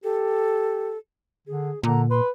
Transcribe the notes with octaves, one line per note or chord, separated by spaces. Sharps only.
G4 A4
D3 G#4
A#2 D3 A#5
B4 C6